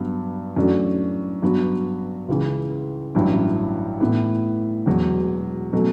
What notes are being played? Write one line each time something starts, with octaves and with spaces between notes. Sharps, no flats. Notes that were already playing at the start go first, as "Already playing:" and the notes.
Already playing: G2 F#3 B3
F#2 E3 A3 D4 F#4
G2 F#3 B3 F#4
C#2 C#3 E3
A1 G2 F#3 C#4 E4
A2 E3 B3 E4
E1 E2 B2 F#3
B2 F#3 A3 C#4